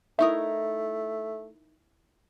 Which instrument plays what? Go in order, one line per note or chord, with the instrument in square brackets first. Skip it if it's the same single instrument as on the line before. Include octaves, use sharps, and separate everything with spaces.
[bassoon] A3 [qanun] D#4 E4 A#4 [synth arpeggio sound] E5 C#6 D#6